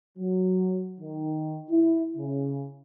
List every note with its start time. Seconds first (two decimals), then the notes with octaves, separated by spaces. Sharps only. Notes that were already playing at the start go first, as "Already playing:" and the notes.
0.18 F#3
1.00 D#3
1.71 E4
2.17 C#3